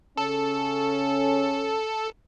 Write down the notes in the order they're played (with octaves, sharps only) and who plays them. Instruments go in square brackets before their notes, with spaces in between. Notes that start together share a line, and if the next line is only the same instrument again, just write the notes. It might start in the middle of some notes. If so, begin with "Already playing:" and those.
[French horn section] C#3 C#4 [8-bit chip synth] A4